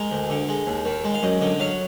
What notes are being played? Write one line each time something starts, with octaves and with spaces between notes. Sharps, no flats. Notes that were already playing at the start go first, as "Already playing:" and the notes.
Already playing: G#3 A#4
D2
D3
G#3
D#2
D#3
G#3
F5
F#2 D#5
D3 D#5
F#3 F5